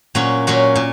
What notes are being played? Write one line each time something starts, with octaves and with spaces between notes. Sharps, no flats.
A#2 F#3 C#4 F#4
A#2 F#3 C#4 F#4
A#2